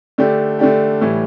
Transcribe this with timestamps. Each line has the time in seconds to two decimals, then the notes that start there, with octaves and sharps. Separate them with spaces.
0.18 D3 A3 D4 G4
0.59 D3 A3 D4 G4
1.01 A2 E3 G3